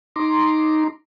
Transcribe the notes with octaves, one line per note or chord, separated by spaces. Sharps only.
D#4 A#5 C6 D6